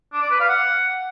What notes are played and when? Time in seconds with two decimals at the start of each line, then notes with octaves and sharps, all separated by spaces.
0.13 D4
0.22 D5
0.31 B4
0.40 F5
0.49 F#5